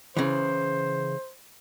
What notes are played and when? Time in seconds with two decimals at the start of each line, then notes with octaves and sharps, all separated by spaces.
0.17 C#3 E3 C5